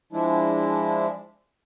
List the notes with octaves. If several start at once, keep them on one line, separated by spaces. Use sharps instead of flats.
F3 G#3 D4 E4